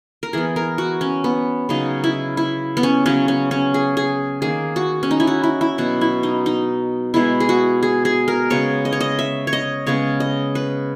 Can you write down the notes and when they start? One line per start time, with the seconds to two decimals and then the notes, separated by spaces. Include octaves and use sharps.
0.23 A#4
0.33 E3 B3 G#4
0.56 A#4
0.78 F#4
1.01 C#4
1.24 B3
1.69 C#3 F#3 B3 D#4
2.04 E4
2.37 E4
2.77 B3
2.83 C#4
3.06 C#3 F#3 B3 C#4
3.28 C#4
3.51 C#4
3.74 G#4
3.97 G#4
4.42 D#3 A#3 G#4
4.76 F#4
5.03 C#4
5.11 D#4
5.20 E4
5.27 F#4
5.44 E4
5.61 E4
5.78 B2 F#3 B3 F#4
6.01 E4
6.23 D#4
6.46 D#4
7.14 B2 G#3 B3 E4
7.40 G#4
7.49 F#4
7.83 G#4
8.05 G#4
8.28 A#4
8.50 C#3 G#3 B3 C#5
8.85 D#5
8.93 C#5
9.00 D#5
9.19 E5
9.47 C#5
9.53 D#5
9.87 C#3 G#3 B3 C#5
10.20 D#5
10.55 B4